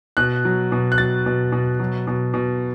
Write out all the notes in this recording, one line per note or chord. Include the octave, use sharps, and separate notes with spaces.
B2 F#6
F#3
B2
F#6
F#3 A6
B2
B2
F#3
B2
B2